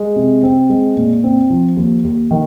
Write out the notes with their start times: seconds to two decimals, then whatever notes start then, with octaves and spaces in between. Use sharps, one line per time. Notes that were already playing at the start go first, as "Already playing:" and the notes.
Already playing: G#3
0.16 C3
0.43 C4
0.70 G#3
0.97 A#2
1.24 C4
1.50 F3
1.77 D#2
2.04 D#2
2.31 D#3